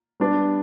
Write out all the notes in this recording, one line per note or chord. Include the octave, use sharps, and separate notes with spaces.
G3 B3 D4